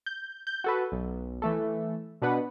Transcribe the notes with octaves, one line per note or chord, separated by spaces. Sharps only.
G6
G6
F#4 A4 B4
B1
E3 A3 A4
B2 D4 B4 F#5